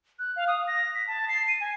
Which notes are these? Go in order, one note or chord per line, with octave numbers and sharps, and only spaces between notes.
F#6
F5
D#6
A#6
B6
A5
C7
D#7
G#5